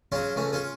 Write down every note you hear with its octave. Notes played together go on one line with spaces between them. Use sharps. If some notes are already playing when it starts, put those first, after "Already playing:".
C#3 F#3 C#4 F4
C#2 A3 C#4
C#4 F4